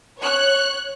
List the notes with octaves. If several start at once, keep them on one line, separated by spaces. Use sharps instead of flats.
C#5 F#6